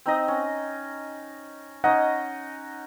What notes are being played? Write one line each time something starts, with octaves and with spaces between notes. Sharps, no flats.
C4 D#4 D#5
C#4
C#4 D#4 D#5 F#5